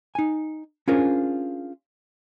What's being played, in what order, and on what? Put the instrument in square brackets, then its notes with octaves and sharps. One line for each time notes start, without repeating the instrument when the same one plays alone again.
[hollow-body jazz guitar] D#4 G#5
C#4 D4 F4 G#4 A#4 C5